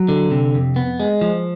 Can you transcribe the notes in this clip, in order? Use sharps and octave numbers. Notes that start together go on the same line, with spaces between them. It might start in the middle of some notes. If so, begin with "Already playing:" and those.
Already playing: F#3
D3
C3
F2
B3
G#3
F3